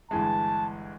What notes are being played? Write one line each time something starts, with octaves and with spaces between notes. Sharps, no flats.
G1 E3 G#3 A5